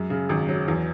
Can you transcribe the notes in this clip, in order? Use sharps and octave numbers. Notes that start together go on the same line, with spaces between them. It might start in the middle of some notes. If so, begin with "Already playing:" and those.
Already playing: F#2 G#3
C#3
G#1
F#3
E2